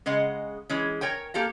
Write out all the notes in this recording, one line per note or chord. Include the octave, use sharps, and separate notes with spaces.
C#3 G#3 D#5 F#5
E3 G#3 C#4
A#4 C#5 G5 G#5
A#3 G4 A4 F5